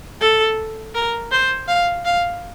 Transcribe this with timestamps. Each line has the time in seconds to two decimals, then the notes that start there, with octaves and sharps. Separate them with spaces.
0.21 A4
0.95 A#4
1.31 C5
1.68 F5
2.05 F5